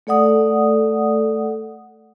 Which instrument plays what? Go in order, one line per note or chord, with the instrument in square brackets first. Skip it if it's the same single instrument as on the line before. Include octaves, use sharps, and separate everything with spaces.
[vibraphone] A3 A4 D5 F#5 D#6